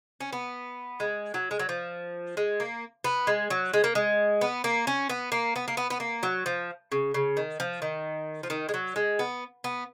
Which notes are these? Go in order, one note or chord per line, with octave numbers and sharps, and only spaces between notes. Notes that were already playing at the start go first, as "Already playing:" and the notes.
C#4
B3
G#3
F#3
G#3
F#3
F3
G#3
A#3
B3
G#3
F#3
G#3
A#3
G#3
B3
A#3
C#4
B3
A#3
B3
A#3
B3
B3
A#3
F#3
F3
C#3
C#3
D#3
F3
D#3
F3
D#3
G#3
F#3
G#3
B3
B3